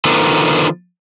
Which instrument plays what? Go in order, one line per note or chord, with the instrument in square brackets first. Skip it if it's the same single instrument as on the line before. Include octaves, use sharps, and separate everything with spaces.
[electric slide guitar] D3 D#3 F3 A3 B3